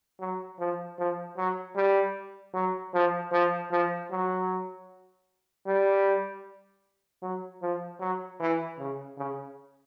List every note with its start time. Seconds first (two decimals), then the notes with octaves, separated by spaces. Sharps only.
0.21 F#3
0.59 F3
0.99 F3
1.37 F#3
1.76 G3
2.54 F#3
2.94 F3
3.32 F3
3.72 F3
4.11 F#3
5.67 G3
7.23 F#3
7.62 F3
8.00 F#3
8.40 E3
8.79 C#3
9.18 C#3